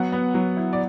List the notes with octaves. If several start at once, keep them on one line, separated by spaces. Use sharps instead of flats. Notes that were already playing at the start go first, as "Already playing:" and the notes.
Already playing: F#3 B3 F#5
B3
F#3
E4
D5